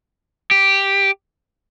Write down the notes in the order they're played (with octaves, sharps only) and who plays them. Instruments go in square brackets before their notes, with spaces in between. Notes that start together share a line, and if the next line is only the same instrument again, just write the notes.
[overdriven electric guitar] G4